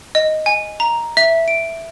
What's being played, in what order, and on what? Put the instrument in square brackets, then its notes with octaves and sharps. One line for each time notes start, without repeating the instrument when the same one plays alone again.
[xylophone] D#5
G#5
A#5
E5
D7